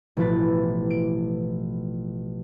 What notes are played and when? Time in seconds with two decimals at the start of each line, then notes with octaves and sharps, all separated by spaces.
0.17 A1 B2 F3 E4 B4 A6
0.90 D7